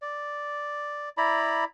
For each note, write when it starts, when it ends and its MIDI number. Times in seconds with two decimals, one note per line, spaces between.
0.02 1.09 74
1.17 1.64 64
1.17 1.64 74
1.17 1.64 82
1.17 1.64 83